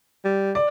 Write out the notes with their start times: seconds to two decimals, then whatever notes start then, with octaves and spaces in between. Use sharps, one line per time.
0.25 G3
0.55 D5